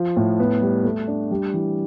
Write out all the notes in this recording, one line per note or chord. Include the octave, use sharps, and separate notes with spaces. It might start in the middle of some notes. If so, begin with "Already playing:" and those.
Already playing: F3
A2
B3
G3
A3
D4
G3
E3